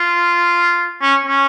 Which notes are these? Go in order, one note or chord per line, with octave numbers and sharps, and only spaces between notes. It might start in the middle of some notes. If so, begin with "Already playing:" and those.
Already playing: F4
C#4
C#4